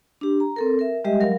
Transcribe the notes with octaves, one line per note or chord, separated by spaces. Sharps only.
D4 G4
A#5
C4 A4 A#4
A#4 E5
G3 G#3 G4 D#5 E5
F#3 A#4 F5